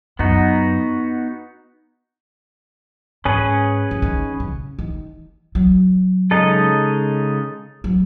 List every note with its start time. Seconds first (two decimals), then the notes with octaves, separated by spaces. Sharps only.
0.19 F#2 B3 D#4 F#4
3.25 G#2 C#4 G#4 B4
3.91 C#3
4.02 D#3
4.40 C#3
4.79 D#3
5.55 F#3
6.31 C#3 G#3 D#4 A4 D#5
7.84 F#3